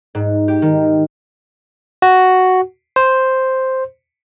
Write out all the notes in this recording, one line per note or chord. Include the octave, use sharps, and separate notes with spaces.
G#2
G4
D#3
F#4
C5